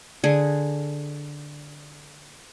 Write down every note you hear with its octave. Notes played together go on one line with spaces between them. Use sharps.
D3 G#4